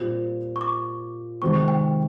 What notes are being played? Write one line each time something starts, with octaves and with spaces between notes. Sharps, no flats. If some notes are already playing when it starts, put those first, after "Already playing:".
Already playing: A#2 G3 C4 F4
C#6
D6
C3 D#3 G#3 C4 C#6
G5